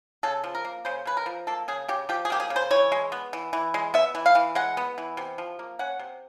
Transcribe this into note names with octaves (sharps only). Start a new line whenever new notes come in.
C#3 A4
F3
A#4
A#3
C#3 C5
C#3 B4
A#4
F3
A#3 A4
C#3 G#4
C#3 G4
F3 G4
G#4
A#3 G4
G#4
C#3
C5
E3 C#5
G#3
B3
E3
E3
G#3
B3 E5
E3
F5
E3
G#3 F#5
B3
E3
C3
F3
A#3
C#4 F#5
C3